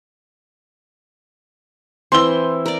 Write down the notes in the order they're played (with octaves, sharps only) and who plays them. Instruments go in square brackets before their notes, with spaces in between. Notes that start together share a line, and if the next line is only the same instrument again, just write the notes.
[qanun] E3 C4 [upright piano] C6 E6 G7
[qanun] A#4 D5